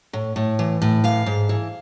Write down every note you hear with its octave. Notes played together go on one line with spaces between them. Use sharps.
A2
A2
E3
A2
E3 F5
G#2
E3